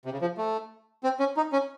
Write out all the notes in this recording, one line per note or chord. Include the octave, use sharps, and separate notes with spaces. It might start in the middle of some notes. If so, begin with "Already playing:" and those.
C3
C#3
F3
A3
C4
C#4
D#4
C#4